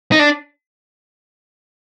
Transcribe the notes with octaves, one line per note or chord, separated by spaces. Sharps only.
D#4
D4